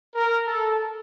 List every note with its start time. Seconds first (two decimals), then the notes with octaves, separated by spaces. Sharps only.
0.15 A#4
0.47 A4